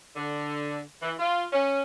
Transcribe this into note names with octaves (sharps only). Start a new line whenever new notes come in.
D3
E3
F4
C#4